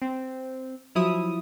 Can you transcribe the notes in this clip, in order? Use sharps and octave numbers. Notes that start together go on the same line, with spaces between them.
C4
F3 F#3 E4 D#6